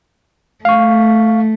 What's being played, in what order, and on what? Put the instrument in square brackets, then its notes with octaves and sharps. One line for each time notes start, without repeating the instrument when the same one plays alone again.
[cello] A3 [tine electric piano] F5 C#6